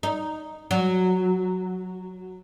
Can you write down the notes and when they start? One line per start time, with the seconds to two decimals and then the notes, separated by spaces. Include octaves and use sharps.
0.03 D#4
0.71 F#3